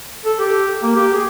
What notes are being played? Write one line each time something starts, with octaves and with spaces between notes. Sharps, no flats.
A4
G4
A#3
G4
G#4